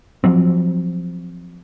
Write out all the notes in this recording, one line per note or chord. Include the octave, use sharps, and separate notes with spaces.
F3 F#3 C4